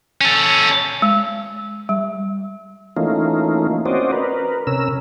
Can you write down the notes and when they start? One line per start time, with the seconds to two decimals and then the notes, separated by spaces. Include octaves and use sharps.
0.21 C#4 A4
1.02 G#3
1.89 G3
2.97 E3 A3 A#3 C#4 D#4 F4
3.86 C4 C#4 F#4 C5 D5 D#5
4.12 A#4 B4
4.67 C3 C#4 A#4 E6